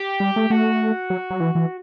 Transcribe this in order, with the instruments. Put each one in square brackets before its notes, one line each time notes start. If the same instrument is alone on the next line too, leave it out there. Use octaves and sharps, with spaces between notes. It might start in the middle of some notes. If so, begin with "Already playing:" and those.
Already playing: [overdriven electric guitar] G4
[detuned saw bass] G3
A3
[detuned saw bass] A3 [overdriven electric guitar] F#4
[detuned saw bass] F#3
F#3
E3
E3